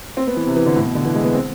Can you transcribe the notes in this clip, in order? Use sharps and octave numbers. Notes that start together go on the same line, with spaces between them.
C4
B3
E3
C3
E3
D3
A2
B2
D3
E3
G#3
B3
C4